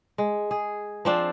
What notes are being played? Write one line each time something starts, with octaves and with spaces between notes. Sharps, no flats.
G#3
G#4
F3 C4 D4